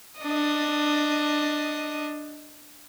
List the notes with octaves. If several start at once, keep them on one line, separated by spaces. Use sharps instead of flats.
D4 D#5